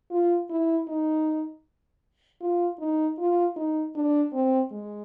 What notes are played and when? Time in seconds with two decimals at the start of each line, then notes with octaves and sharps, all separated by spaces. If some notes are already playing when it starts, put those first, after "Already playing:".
0.11 F4
0.50 E4
0.88 D#4
2.41 F4
2.79 D#4
3.18 F4
3.56 D#4
3.95 D4
4.33 C4
4.71 G#3